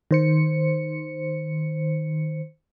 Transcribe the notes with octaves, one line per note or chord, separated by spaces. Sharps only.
D#3 C5 C#7